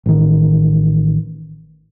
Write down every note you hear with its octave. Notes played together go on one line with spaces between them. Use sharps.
A1 D#3